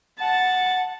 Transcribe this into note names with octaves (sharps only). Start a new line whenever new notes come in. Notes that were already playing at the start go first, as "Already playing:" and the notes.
F#5 A5